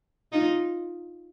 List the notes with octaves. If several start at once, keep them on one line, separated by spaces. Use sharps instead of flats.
D#4 F4